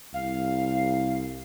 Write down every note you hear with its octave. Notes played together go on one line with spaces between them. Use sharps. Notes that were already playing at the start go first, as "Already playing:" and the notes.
C2 F5